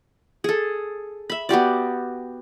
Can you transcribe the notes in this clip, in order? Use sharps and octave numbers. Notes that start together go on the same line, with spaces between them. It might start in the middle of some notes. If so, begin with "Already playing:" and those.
G#4 A4
E5 B5
B3 F#4 G4 D5